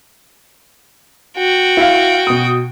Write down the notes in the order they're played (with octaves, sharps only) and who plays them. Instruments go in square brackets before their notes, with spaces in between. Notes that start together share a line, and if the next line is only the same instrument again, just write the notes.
[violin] F#4 G5
[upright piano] E4 F5
B2 D#6